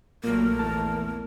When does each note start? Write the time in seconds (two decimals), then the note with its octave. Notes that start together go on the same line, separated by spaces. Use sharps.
0.24 A#1 A#2 F#3 A3 A#3 A#4
0.59 E2 A5